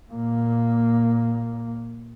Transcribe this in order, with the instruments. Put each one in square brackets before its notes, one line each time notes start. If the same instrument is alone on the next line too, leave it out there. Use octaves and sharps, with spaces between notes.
[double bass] A#2 A#3